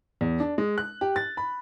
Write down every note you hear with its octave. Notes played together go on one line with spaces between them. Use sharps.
E2
D4
G#3
F#6
G4
A6
B5